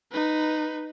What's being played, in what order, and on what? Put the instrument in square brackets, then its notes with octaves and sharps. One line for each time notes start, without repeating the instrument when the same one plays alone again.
[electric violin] D#4 B4